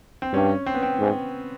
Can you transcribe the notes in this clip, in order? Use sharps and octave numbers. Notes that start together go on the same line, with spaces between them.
C4
G2 C#4
C4
B3
C4
G#2